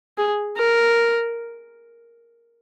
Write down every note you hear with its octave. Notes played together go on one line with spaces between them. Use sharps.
G#4
A#4